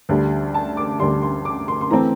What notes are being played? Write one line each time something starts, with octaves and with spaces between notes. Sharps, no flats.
D2 D3 G3
A5
D6
D2 D3 G3 C6
C6
D6
C6
C6
E3 A3 C4 A#5